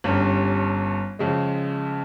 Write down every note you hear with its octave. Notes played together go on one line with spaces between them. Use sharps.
G1 G2 G3 C#4
F2 C#3 G#3